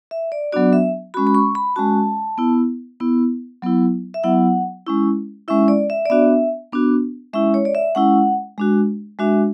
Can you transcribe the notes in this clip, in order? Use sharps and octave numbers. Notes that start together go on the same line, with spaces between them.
E5
D5
F#3 B3 D4 F#4 D5
E5
G#3 C#4 F#4 B5
B5
C#6
B5
G#3 C#4 F#4 A5
B3 E4
B3 E4
F#3 B3 E4
E5
F#3 B3 E4 F#5
G#3 C#4 E4
G#3 C#4 E4 E5
D5
E5
D5
B3 D4 F#4 E5
B3 D4 F#4
G#3 C#4 E4 E5
C#5
D5
E5
G#3 C#4 E4 F#5
G#3 D4 F#4
G#3 D4 F#4 E5